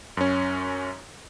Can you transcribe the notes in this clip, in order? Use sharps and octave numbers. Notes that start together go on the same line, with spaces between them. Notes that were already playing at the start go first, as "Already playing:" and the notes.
F#2 C#4